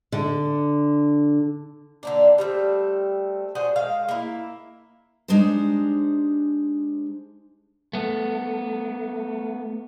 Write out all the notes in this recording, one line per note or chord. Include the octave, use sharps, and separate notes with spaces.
D3
D3 A#3 D4
G3 A3 C4
D4 F#4 G#4 C5
D#3 G#3 F5
A#3 E4
G#3 D4 D#4 G4 C5
A3 B3